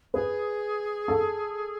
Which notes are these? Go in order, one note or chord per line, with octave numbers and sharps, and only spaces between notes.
G#4 B4
A4